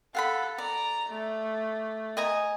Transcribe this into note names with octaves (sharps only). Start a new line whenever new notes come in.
A4 F5 F#5 B5
D5 A#5
A3
D#5 G#5 A#5